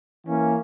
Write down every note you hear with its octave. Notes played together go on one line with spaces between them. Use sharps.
E3 A#3 C#4